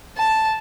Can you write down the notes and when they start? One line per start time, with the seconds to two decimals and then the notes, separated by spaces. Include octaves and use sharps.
0.17 A5